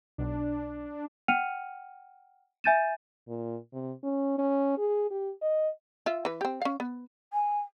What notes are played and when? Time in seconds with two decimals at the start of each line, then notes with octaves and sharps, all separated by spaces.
0.18 B1 D4
1.28 F#5 G5 F6 C#7 D#7 F7
2.64 E5 G#5 G6 A6 D#7 E7
3.28 A#2
3.73 C3
4.03 C#4
4.38 C#4
4.78 G#4
5.11 G4
5.42 D#5
6.06 F4 E5
6.25 E3 B4
6.41 C4 G4
6.62 C#4 F5
6.80 B3
7.33 G#5